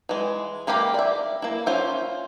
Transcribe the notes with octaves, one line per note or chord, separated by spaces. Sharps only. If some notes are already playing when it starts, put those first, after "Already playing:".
E3 G#3
G#3 A#3 G4 F5 B5
D5 E5
A#3 E4
C#4 F4 C5 E5